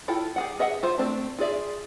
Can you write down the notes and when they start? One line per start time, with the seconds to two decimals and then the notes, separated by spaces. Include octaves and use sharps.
0.08 E4 F4 A4 G5
0.36 G4 G#4 F#5
0.59 G#4 D#5 E5 F#5
0.83 F4 C5 E5
0.98 A3 C4 D4
1.39 F4 G#4 D5 E5